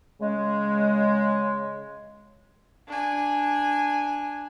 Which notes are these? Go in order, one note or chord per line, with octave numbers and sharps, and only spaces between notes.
C#3 G#3
D4 G#5